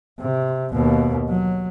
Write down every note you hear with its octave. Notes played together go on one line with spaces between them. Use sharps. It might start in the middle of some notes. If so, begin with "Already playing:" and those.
C3
D#2 B2
F#3